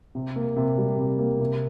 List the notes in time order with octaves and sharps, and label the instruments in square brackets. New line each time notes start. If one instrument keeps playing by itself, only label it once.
[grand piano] C3
A#3
C3
G3
C3
A#3
C3